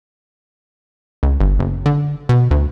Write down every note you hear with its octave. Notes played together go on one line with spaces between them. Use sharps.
C#2
G1
F#1
D3
B2
D2